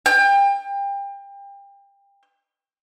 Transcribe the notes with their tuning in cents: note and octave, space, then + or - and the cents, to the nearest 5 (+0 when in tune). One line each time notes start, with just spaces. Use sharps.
G5 +30